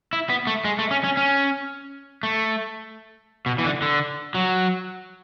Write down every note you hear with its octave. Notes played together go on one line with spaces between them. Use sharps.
E4
B3
A3
G#3
A3
C#4
C#4
C#4
A3
B2
E3
D3
D3
F#3